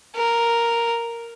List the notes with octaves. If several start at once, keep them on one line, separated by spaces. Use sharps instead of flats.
A#4